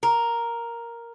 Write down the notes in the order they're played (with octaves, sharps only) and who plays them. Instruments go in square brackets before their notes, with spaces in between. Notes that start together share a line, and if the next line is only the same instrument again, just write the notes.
[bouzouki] A#4